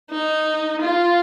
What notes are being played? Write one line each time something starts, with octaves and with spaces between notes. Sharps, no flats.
D#4
F4